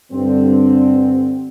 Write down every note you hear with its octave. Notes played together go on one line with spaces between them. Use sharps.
G2 D3 C4